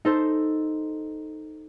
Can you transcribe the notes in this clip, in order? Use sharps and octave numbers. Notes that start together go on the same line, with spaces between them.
D#4 A4 C5